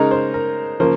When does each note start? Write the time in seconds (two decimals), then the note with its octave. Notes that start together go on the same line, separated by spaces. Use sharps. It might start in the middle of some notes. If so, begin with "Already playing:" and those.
Already playing: C#3 G#3 D#4 A#4 A#5
0.11 C5
0.34 A#4
0.80 C#3 F3 A#3 C5